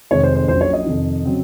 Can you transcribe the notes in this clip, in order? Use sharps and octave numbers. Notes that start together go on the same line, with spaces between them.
F1 F2 D#3 G#3 C#5
C5
C5
A#1 A#2 F#3 C#4 C5
C#5
D#5
F2 C3 D#3
C#3 F#3 C4